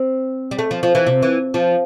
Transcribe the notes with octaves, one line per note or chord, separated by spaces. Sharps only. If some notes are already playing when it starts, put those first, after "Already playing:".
Already playing: C4
G3
A3
F3
F3
E3
C3
E3
F3